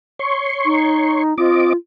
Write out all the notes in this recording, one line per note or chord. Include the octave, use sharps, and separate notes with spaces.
C#5 C6 C#6
D#4
C4 F4 D#5 D6